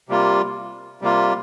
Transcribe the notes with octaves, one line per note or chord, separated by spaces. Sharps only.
C3 G3 A#3 F4
C3 G3 A#3 F4